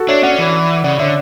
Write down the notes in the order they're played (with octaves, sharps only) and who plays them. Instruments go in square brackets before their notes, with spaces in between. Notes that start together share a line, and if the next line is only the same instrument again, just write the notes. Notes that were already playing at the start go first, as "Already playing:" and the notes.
Already playing: [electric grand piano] F#4 A4
[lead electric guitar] D4 [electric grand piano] C#5 E5
[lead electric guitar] C#4 [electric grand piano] D5 F#5
[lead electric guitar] E3
[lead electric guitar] C#3 [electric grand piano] D5 F#5
[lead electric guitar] D3 [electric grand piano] C#5 E5